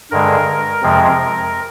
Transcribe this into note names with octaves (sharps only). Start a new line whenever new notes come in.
G2 D3 G#3 A#4
F2 C3 F3 G#3 C4